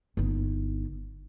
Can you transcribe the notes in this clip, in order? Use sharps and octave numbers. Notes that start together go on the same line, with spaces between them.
G1 D#4